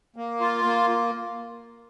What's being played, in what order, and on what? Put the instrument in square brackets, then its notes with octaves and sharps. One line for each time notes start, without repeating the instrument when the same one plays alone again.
[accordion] A#3
F4
A#3